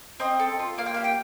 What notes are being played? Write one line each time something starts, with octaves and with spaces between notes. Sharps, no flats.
C4 D#5
A4
F4
A#3 F5
G5
G4 F5
G5